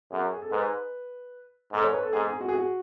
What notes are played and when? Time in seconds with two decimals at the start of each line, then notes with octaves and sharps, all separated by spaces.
0.12 F#2 G#4
0.32 G#4
0.42 A4
0.52 G#2 B4
1.73 G#2 A4
1.84 C#5
1.93 B4
2.03 A4
2.13 G#2 G#4
2.26 G#4
2.40 F#4
2.49 G#4
2.54 F#4